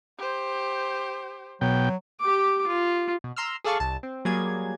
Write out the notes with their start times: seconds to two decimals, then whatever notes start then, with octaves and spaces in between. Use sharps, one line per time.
0.18 G4 C5
1.61 B2 F#3 G5
2.20 G4 D6
2.67 F4
3.24 B2
3.36 A#5 C6 E6 F6
3.64 G#4 A4 D5 F5 A5 C#6
3.80 C2 A5
4.03 C4
4.25 F#3 G3 A#3 G#4 G#6